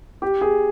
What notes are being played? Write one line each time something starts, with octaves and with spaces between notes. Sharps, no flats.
G4
G#4